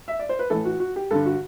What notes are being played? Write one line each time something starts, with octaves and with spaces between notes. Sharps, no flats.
E5
D5
C5
B4
A2 E3 A4
F#4
F#4
G4
G2 D3 A4
F#4